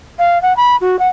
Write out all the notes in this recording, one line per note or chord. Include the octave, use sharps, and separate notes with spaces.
F5
F#5
B5
F#4
F#5